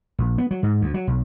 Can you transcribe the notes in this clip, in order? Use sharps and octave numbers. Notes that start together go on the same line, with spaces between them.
A#1
B3
F#3
G#2
D2
F#3
B1